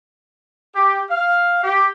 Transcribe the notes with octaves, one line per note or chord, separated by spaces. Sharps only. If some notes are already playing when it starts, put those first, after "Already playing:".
G4
F5
G4